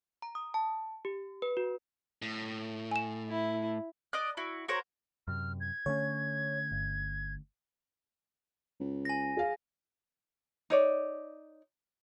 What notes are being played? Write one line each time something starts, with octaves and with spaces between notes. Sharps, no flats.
A#5
D#6
A5
G4
B4
F#4
A2
G#5 E7
E4
D5 D#5 F#6
E4 F#4
F#4 A#4 C5 C#5
F#2 C3 F6
G#6
D3 A3 C#4 C#5
G1
C#2
G#5 A#6
G#4 F5
D#4 C#5 D5